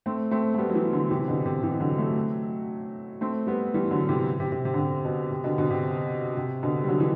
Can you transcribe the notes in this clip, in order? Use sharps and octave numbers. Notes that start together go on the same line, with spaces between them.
A3 C4
A3 C4
A3
G3 B3
F#3
E3 G3
D3 F#3
C3 E3
B2 D3
C3
C3 E3
D3 F#3
F#3 A3
A3 C4
G3 B3
E3 G3
D3 F#3
C3 E3
C3
C3
C3
D3
C3
B2
C3
B2 D3
B2 D3
C3
C3
B2 D3
G3
D3 F#3
E3